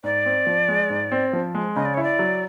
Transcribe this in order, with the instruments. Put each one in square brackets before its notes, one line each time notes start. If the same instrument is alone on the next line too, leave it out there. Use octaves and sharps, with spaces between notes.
[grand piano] G#2 [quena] D5
[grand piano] C4
F3
G#3
G#2
C4
F3
G#3
[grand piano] C#3 [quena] D#5
[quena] D5
[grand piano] E4 [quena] C#5
[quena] D5
[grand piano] F#3